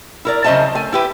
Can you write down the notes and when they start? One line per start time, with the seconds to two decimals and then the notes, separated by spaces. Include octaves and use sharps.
0.25 E4 A#4 D5
0.44 C#3 F#3 C5 D#5 E5 A5
0.75 A3 G#5
0.92 E4 G4 B4